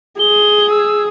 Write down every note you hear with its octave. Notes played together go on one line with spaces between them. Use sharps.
G#4 G7
E6